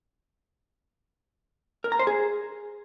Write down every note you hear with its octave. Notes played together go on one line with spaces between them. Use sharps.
A#4
A#5
C5
G#4